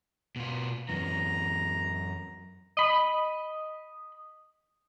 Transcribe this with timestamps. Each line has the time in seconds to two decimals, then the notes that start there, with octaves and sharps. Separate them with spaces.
0.36 B2 F4
0.89 F#2 E3 A#5
2.77 D#5 B5